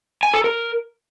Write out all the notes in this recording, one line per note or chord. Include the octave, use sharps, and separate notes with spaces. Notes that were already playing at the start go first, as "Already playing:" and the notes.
G#5
A4
A#4